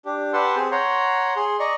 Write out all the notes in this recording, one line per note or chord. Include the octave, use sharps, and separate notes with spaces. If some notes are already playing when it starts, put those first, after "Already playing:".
D4 G4
G4 B4 F#5 A5 C6 E6
C4 G#4 C5
C#5 F#5 A#5 C6
G#4 C6
D5 D#5 A#5 C#6